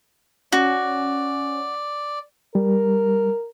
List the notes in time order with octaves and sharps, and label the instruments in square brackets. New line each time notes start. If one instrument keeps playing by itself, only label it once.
[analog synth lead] C#4 [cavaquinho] F#4 [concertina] D5
[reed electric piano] G3 [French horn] A#4